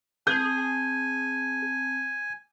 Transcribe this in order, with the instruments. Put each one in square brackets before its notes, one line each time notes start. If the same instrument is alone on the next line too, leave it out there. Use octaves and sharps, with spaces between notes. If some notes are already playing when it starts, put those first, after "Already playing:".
[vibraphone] C4 A5 [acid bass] G#4 [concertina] G#5 [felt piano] G6